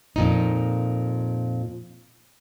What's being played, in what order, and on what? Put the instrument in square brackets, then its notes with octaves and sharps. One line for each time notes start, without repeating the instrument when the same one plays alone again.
[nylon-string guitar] F2 A#2 D#4